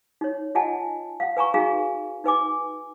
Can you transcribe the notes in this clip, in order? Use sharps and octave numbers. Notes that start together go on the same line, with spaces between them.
D#4 C#5
F4 D#5 F#5 G#5 A5
F5 F#5
B4 G#5 A#5 C#6
D#4 F#4 G#4 F5 G#5 A#5
D#4 B4 G#5 D6